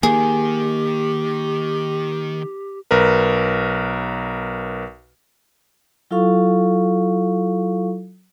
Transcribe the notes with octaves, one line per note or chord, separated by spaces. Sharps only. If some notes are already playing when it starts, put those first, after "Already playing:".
D#3 A#3 G4 G#4
B1 A#4 B4
F#3 E4 F4 A4 F5 C#6